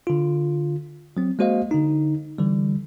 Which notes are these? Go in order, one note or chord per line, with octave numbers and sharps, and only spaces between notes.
D3 F4
F#3 C4
G#3 A#3 F#4 C5 D#5 F5
D3 D#4
D3 E3 G3